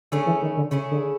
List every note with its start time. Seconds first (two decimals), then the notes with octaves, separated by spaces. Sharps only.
0.12 D3 A3 C#4 E4 G#4
0.26 E3
0.42 D#3
0.57 D3
0.71 C#3 A3 C#4 E4 G#4
0.91 D3